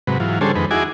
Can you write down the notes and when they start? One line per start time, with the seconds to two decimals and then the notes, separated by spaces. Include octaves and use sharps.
0.07 G#2 C3 F#3 B4
0.20 G#2 E3 F#3 F4
0.41 D3 G3 C#4 G#4 A4 C5
0.56 F2 D#3 G#3 B4
0.71 D#4 E4 F#4 G#4 G#5 D6